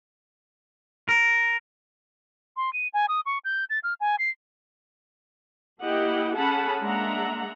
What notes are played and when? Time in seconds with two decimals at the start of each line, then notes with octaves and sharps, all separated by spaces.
1.09 A#4
2.57 C6
2.73 D#7
2.94 G#5
3.08 D#6
3.26 C#6
3.45 G6
3.70 A6
3.83 F6
4.00 G#5
4.19 C7
5.80 A#3 E4 G4 D#5 F#5
6.36 C#4 G#4 A4 F#5 A5 B5
6.82 G#3 A#3 D4 E5 F#5 A#5